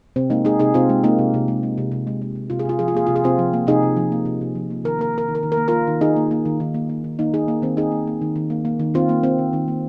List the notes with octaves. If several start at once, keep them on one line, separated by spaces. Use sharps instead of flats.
C3 C4
G#3 A#3 D#4
G#3 D#4 G#4
C3 D#4 G#4
C3 C4 F4
G#3
G#3 A#3 D#4
C3
C3
G#3
G#3
C3
C3
G#3
G#3
C3
C3 F4
G#4
C3 F4
F3 G#4
F4
A#3 G#4
C3 F4
G#4
C3 C4 F4
F3
A#3
C3 D#4 G#4
C3
F3
A#3
C3
C3
F3
A#3
D#3 A#4
A#3 A#4
A#3 A#4
D#3
A#4
D#3
A#4
A#3
A#3 F4 A#4
D#3
D#3 D#4 G#4
A#3
A#3
D#3
D#3
A#3
A#3
D#3
D#3 A#3 D#4
A#3 D#4 G#4
A#3
D#3 C4
D#3 D#4 G#4
A#3
A#3
D#3
D#3
A#3
A#3
D#3
D#3 C4 F4
A#3
A#3 C4
D#3
D#3
A#3